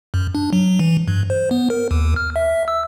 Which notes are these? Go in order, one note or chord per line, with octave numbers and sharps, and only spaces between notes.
F#2
D4
F#3
E3
G2
C5
B3
A#4
D#2
F6
E5
E6